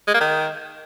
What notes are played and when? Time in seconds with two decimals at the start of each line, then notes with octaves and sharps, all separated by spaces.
0.07 G#3
0.14 A#3
0.20 D#3